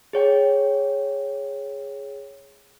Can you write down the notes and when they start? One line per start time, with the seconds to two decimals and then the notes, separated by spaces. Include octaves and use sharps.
0.13 G#4 C#5 G5